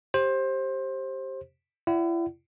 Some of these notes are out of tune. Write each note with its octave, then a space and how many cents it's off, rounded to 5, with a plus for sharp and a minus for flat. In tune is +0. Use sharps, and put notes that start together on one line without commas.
G4 -5 C5 +20
E4 +35 D5 +10 F#5 +35